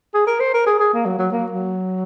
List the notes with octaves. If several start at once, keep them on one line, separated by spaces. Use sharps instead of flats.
G#4
A#4
C5
A#4
G#4
G#4
A#3
F#3
F#3
A#3
F#3